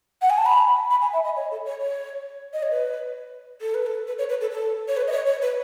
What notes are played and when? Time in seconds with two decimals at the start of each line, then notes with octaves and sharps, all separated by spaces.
0.22 F#5
0.30 G#5
0.38 A5
0.46 B5
0.90 B5
1.01 G#5
1.13 E5
1.24 D#5
1.36 C#5
1.51 A4
1.65 C#5
1.81 C#5
2.53 D#5
2.63 C#5
2.71 B4
3.61 A4
3.74 B4
3.86 A4
4.07 B4
4.18 C#5
4.29 B4
4.41 A4
4.51 A4
4.88 C#5
4.97 B4
5.07 D#5
5.12 C#5
5.27 C#5
5.42 B4